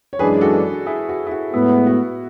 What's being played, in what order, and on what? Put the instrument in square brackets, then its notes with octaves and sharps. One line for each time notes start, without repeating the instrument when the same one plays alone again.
[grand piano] C#5
[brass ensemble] F#2 E3 G#3 D4 [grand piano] G#4 B4
[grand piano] F#4 A4
E4 G#4
F#4
E4
F#4
[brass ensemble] A2 G#3 B3 [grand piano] E4
[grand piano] F#4